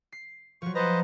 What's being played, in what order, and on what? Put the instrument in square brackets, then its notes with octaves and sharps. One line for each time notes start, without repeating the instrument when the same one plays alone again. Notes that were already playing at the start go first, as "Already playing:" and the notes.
[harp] C7
[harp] F3 F#3 [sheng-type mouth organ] C#6
[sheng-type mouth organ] B4 C5 D#5 [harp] F#5 A5 A#5